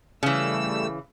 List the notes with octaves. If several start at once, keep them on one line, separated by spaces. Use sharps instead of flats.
C#3 E3 G3 A3 E6